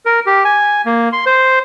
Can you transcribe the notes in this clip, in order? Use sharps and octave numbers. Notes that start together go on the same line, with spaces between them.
A#4
G4
G#5
A#3
C6
C5